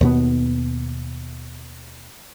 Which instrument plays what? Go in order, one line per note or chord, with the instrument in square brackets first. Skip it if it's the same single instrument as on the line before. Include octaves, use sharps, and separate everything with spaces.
[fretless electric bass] D#2 B2 B3